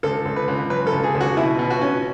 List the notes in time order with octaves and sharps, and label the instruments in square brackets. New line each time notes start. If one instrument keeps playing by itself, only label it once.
[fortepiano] C#2 A4
C#2
B4
C#2
F#3 B4
A4
C#2
G#4
C#2
F#4
B2 E4
B2
F#4
C#4